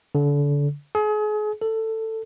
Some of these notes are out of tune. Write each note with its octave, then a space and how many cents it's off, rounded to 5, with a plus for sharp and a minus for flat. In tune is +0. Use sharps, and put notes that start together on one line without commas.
D3 -30
G#4 +35
A4 +15